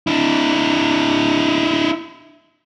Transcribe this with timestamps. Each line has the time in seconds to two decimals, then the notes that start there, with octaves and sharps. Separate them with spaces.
0.07 D4 E4